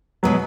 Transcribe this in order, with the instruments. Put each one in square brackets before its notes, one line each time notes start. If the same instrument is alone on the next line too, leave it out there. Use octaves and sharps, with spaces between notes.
[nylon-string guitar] B2 G#3 B3 [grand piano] F#3